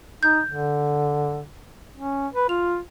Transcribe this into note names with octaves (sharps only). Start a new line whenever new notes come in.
D#4 G6
D3
C#4
B4
F4 F7